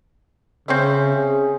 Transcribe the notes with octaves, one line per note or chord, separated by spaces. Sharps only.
C#3 C4 C#4 E5
G#4